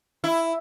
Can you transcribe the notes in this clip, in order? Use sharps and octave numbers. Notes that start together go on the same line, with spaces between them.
E4